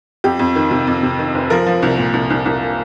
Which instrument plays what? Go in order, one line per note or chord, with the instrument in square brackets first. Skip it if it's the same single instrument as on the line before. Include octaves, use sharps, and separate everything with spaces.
[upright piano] F2 G4
F2
D#3
C3
F2
C3
D#3
F1
F3 A#4
F3
C2
A#2
C2
C2
C2